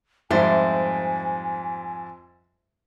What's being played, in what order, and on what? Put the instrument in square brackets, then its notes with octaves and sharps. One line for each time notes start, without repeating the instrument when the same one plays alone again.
[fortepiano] F2 G#2 G3 [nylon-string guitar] C5 [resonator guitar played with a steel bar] E5 [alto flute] G#5